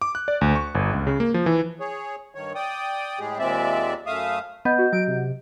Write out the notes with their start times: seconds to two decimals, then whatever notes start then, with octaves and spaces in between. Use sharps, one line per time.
0.02 D6
0.15 F#6
0.28 D5
0.41 D2
0.55 C#6
0.75 G1
0.93 C#2
1.07 C#3
1.20 A#3
1.34 F3
1.46 E3
1.80 G#4 C#5
2.35 G2 D#3 C#5
2.55 D5 G5 D#6
3.19 A2 G#3 G4 G#4
3.39 D#2 A#2 G#3 C4 D5 E5
4.06 F#2 A3 E5 F5 D#6
4.65 B3 D#5 F#5 G6
4.78 F#4
4.93 F#3 D7
5.07 C3